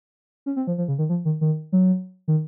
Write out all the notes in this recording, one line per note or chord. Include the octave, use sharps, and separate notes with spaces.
C#4
C4
F3
F3
C#3
D#3
F3
D#3
D#3
F#3
D#3